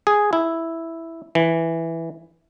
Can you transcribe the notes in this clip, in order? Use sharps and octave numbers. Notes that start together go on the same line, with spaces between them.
G#4
E4
E3